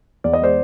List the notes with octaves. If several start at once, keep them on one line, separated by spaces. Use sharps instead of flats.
E2 D5
D#5
G#3 C5 D5